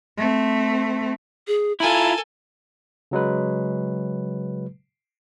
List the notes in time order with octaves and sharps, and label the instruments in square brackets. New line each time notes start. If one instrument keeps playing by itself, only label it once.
[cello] A3 C4
[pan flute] G#4
[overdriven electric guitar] E4 F4 [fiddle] A4 G#5 [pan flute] A#5
[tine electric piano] C#3 F#3 G#3 B4